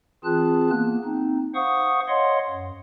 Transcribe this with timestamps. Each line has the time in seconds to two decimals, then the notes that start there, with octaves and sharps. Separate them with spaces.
0.24 E3 C4 F4 G#4 A5 F#6
0.70 A#3 B3
1.04 C4 D#4
1.55 C5 F5 F#5 C#6 D#6
2.08 C#5 D#5 F5 F#5 C6
2.49 F#2